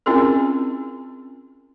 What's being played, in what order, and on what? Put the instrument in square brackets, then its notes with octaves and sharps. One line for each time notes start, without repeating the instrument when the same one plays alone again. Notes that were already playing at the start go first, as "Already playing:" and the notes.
[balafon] C4 C#4 E4 F4 G#4 A#4